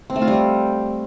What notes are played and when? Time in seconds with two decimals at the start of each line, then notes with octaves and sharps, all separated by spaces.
0.10 C4
0.16 A3
0.22 F4
0.28 G3